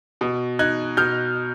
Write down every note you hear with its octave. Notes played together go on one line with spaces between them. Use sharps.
B2
D#4 F#6 G#6
B2 F6 G6